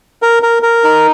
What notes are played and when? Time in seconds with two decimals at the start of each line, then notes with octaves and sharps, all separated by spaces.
0.22 A#4
0.43 A#4
0.63 A#4
0.84 D#4